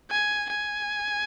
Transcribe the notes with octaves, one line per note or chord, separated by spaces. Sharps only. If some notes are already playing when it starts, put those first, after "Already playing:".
G#5
G#5